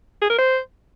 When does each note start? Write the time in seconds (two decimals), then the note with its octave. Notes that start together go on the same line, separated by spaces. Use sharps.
0.22 G#4
0.30 A#4
0.39 C5